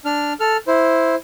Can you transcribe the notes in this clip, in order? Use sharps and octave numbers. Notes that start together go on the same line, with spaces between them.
D4 F6
A4 F6
E4 C5